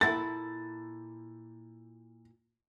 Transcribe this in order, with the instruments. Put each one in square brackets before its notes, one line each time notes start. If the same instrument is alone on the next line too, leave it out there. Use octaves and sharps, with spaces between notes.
[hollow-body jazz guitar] A#2 E4 A4 [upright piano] A6